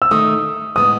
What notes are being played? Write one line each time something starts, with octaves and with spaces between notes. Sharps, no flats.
E6
D#3 A3 D#4 D#6
A2 G#3 B3 D#6